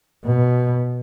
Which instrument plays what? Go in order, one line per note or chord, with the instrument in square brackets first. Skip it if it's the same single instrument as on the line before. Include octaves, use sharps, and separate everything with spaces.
[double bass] B2